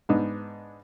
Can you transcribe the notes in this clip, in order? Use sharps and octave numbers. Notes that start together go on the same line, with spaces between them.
G#2 B3 D4 D#4